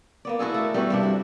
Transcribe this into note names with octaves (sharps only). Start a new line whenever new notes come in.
A#3 B3 D5
E4 F#4 G#4 A4
A3 A#4
G3 B3 F#4
G2 C3 D4
F#4